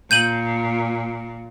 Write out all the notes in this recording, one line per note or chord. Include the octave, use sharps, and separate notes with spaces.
A#2 G6 D#7 F#7